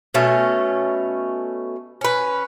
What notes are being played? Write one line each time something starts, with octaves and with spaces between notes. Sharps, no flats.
B2 A3 C#4
C#4 B4